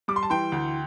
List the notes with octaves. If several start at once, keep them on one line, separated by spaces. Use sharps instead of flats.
G3 D6
C6
A5
E3 G5 C6
D2